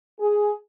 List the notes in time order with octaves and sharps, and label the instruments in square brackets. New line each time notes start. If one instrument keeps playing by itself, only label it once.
[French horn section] G#4